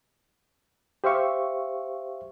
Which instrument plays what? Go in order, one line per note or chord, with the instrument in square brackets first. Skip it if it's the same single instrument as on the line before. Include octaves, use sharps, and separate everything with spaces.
[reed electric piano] G4 C5 E5 F5 C#6